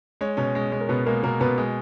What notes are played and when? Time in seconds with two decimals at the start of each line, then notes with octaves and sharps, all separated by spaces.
0.21 G#3 C#5
0.37 B2 C#4 C#5
0.55 G#3
0.72 G#3
0.81 A#4
0.89 B2 B3 B4
1.06 G#3 A#3 A#4
1.23 B2 A#3 A#4
1.40 B2 B3 B4
1.58 G#3 G#4